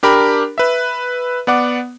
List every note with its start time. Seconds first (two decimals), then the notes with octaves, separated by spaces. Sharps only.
0.03 D4 G4 A#4 B5
0.58 B4 E5
1.47 B3 D5 F#5 D6